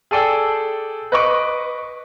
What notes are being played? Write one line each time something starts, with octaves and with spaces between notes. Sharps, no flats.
G#4 A4 D5 G5 E6
B4 D#5 C#6 D6